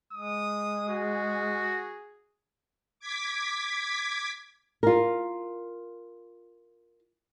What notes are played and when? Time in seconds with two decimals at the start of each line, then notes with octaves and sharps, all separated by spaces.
0.13 G#3 D#6
0.89 F#4 G#4
3.00 D6 G#6 B6
4.83 F4 A#4